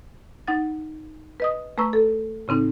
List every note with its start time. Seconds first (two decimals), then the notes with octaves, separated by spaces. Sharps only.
0.48 D#4 F#5 A6
1.40 B4 D#5 D#6
1.78 A3 B4 A#5 C#6 E6
1.93 A4
2.48 A2 C#3 C4 D#4